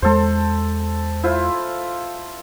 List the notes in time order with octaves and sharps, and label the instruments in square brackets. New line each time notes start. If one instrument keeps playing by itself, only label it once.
[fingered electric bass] E2 G#3 [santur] A4 C5
[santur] E4 F4 C5